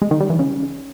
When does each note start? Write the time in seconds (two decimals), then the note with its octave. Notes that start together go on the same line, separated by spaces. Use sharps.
0.02 G#3
0.11 D#3
0.20 G3
0.30 E3
0.39 C#3